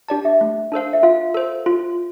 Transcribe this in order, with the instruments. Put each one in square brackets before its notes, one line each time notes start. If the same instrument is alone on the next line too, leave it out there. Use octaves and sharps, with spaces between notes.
[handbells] D4 G4 D5 A5
[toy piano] E5
[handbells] A3
D4 A4 C5 F5
[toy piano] E5
[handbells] F4 [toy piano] F5
[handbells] A4 C5
F4